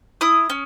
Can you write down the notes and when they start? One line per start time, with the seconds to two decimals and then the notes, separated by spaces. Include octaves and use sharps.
0.21 E4 D#6
0.50 C#4